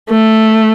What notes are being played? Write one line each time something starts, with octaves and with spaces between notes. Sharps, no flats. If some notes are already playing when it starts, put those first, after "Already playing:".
A3